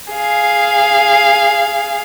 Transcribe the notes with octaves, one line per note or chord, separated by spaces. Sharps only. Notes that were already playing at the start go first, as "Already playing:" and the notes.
G#4 F5